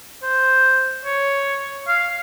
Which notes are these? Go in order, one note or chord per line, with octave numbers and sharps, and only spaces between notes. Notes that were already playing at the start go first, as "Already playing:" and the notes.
C5
C#5
F5